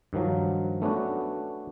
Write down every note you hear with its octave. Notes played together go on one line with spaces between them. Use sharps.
G2 D#3 F3 F#3
A3 B3 C#4 D4 F#4